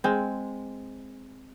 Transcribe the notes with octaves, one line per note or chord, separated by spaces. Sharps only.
G#3 C4